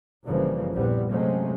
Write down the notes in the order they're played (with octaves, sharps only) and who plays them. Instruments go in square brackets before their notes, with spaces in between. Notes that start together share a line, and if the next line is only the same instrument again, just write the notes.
[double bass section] G1 G2 C#3 E3 F3 A#3
A#1 E2 G3 B3 C4
C3 F#3 G#3 A3 C4 C#4